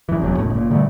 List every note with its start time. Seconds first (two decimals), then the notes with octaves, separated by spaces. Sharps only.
0.09 F#2 E3
0.20 F1 E2 F#3
0.35 E1 C#2 A2
0.52 F#1 A#2
0.70 A#2 D3 G3 A3